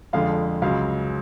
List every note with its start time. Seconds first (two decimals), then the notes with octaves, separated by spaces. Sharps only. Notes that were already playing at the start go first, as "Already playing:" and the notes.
0.13 F2 D3 F3 G#3 F5
0.62 C#2 C#3 F#3 F5